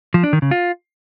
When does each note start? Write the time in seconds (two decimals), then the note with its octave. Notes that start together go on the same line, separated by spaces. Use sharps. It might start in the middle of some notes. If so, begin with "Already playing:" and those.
0.14 F3
0.24 D4
0.33 D#3
0.42 C#3
0.51 F4